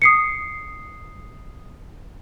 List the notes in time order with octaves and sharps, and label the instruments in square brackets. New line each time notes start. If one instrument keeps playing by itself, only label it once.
[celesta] D#6 C7 C#7